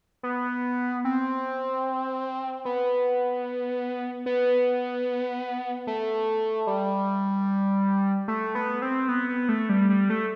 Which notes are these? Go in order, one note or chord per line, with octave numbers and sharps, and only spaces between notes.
B3
C4
B3
B3
A3
G3
A3
B3
C4
B3
B3
A3
G3
G3
A3